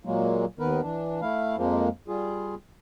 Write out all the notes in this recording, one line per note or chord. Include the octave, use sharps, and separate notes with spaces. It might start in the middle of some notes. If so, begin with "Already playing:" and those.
A#2 F#3 G#3 A#3
D#2 D#3 B3 A#4 B4
E3 D4
A3 E4 F5
F2 F3 G#3 A#3
G3 F4 G#4